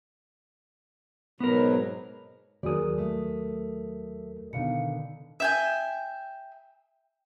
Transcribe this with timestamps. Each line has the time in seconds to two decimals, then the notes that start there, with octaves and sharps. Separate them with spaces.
1.40 G#2 B2 F#3 B3 A#4
2.63 D#2 F#3 F#4 G#4 A#4 D5 D#6
2.98 A3
4.53 B2 D3 D#3 D#4 F5 C#7
5.40 E5 G5 G#5